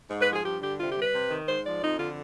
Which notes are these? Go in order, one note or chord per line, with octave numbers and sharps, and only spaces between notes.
G#2
B4
F3
G#4
G2 G4
D3 G4
C3 F4
G4
G3
B4
C3
D#3
G#2 C5
F3 D5
F2 D#4
D3 F4